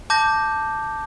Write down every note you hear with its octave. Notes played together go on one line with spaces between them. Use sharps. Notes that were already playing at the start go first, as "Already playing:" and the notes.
A5 D6 G6 A#6